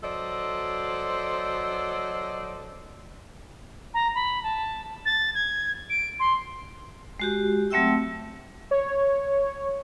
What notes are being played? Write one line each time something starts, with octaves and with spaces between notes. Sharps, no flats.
F#3 A4 C5 D5 D#5
A#5
B5
A5
A6
G#6
D7
C6
G#3 F#4 G4
F#3 A3 C4 E5 G5 E6
C#5